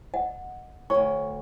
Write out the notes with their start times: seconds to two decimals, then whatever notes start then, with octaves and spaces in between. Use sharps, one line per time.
0.14 D#5 F#5
0.90 D2 C#5 C#6